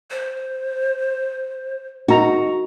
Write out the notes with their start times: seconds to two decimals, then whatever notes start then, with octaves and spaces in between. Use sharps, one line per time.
0.10 C5
2.08 D#4 F#4 A#5